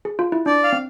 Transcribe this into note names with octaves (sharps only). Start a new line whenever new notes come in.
G#4
F4
E4
D4 D5
F5
C4